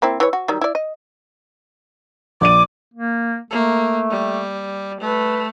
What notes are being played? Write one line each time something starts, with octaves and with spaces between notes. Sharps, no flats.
A#3 C4 E4
E3 C#5
F#4
D#3 F#3 G3
E4 D5
D#5
A#1 D5 D6 D#7
A#3
A3 A#3
G3
A3 B4